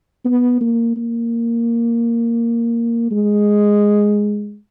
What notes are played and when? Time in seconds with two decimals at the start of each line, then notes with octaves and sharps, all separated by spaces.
0.25 B3
0.61 A#3
0.96 A#3
3.11 G#3